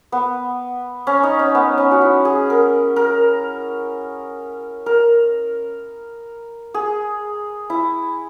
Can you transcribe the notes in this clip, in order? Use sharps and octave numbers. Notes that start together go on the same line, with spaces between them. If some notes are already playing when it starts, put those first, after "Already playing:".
B3
C#4
D#4
C#4
B3
C#4
F#4
E4
G#4
A#4
A#4
A#4
G#4
E4